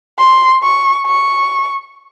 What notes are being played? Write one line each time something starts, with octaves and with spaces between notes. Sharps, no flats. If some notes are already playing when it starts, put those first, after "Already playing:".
C6
C#6
C#6